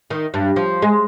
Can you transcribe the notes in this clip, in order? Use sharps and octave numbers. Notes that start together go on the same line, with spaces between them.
D#3
G2
F3
G#3